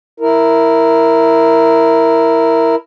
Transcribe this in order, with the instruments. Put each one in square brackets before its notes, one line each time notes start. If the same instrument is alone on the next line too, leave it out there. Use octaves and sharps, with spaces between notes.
[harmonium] E4 A#4